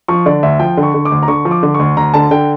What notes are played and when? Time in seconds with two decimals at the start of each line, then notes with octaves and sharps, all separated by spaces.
0.08 F3 C#6
0.26 D3 D5
0.43 D2 E5
0.60 F3 G5
0.77 D3
0.83 C#6
0.94 D3
1.05 D6
1.12 D2
1.23 A#5
1.28 D3 C#6
1.45 F3
1.51 D6
1.63 D3
1.74 D2 C#6
1.97 D2 A#5
2.14 D3 A5
2.31 D3 G5